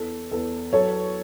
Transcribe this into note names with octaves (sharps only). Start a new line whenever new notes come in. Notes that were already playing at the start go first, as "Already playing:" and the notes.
Already playing: E2 A4
E2 A4
F#3 A4 C#5